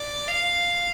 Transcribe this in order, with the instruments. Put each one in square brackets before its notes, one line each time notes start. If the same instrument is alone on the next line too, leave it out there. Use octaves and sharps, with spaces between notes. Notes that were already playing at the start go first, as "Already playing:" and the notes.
Already playing: [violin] D5
F5